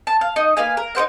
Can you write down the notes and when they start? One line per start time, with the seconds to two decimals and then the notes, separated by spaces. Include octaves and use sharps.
0.07 A5
0.21 F5
0.36 D#4 D#5
0.57 A#3 B4 F5 G#5
0.77 A#4
0.95 D#4 G4 C5 F#5